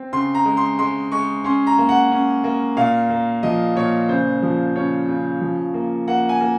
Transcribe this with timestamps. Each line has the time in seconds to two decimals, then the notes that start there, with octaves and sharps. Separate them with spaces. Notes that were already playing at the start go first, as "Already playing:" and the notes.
Already playing: C4
0.13 C#3 C6
0.35 A#5
0.45 G#3
0.57 C6
0.79 G#3 C6
1.12 G#3 C#6
1.44 C#4 C6
1.67 A#5
1.78 A#3
1.89 F#5
2.11 C#4
2.44 A#3
2.77 A#2 F5
3.10 A#3
3.43 F3 D#5
3.76 A#2 C#5
4.09 C#3 C5
4.42 F3
4.75 C#3 C#5
5.08 C#3
5.41 F3
5.74 A#3
6.08 A#3 F#5
6.29 G#5
6.41 A#3